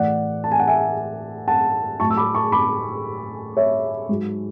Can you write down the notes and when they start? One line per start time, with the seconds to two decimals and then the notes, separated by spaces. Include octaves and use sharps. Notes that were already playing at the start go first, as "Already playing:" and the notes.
Already playing: A2 E3 D5 F#5
0.44 A5
0.52 G#5
0.60 F#5
0.67 E5 G#5
1.48 F#5 A5
2.00 A2 F#3 A5 C#6
2.10 E6
2.17 B5 D6
2.35 A5 C#6
2.52 B5 D6
3.57 C#5 E5
4.09 G#2 F#3